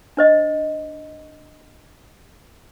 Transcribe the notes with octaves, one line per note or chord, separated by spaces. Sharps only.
D4 C5 D#5